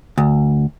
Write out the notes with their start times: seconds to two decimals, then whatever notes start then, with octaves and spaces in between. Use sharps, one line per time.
0.18 D2